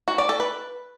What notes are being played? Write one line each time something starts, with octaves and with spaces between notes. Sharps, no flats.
F#4
D5
A4
B4